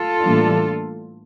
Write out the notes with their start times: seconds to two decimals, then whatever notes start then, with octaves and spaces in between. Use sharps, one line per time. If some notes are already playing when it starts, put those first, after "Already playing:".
Already playing: F4 A4
0.24 A2 E3 G3 A#3 D4